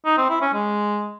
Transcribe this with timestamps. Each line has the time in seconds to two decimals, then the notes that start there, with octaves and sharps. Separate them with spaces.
0.06 D#4
0.18 C4
0.30 E4
0.41 C#4
0.53 G#3